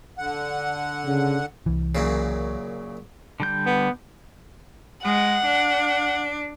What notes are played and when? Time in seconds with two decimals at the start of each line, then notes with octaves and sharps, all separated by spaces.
0.18 D3 F#5
1.05 C#3
1.66 C2 E3
1.95 F#2 A#2 C#3
3.40 D3 G3 G6
3.66 B3
5.04 G#3 F#5
5.45 D4